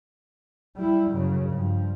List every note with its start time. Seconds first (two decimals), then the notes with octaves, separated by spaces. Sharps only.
0.76 G3 E4
1.11 F#2 C#3
1.50 G2 F3